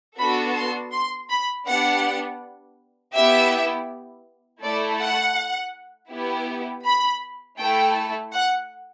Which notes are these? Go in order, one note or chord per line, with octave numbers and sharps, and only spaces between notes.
B3 D4 F#4 A4 B5
C6
C6
B5
B3 D4 G4 F#5
B3 E4 G4 E5
A3 E4 A4 D5
F#5
B3 E4 G4
B5
A3 E4 A4 G5
F#5